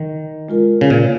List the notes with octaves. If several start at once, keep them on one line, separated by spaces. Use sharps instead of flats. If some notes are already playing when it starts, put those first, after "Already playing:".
Already playing: D#3
G#3 F4 A#4
C#3
A#2